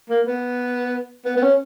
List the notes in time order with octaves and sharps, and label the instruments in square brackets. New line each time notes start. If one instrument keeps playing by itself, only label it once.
[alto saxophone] A#3
B3
B3
B3
C#4